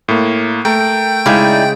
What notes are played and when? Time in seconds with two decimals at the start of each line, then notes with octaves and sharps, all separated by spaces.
0.08 A2 A#3
0.65 A3 A#4 G5
1.26 C#3 G#3 D#4 E4 D5